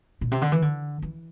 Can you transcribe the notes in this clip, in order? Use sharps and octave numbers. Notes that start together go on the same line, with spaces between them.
A#2
C3
D3
E3
D3
E3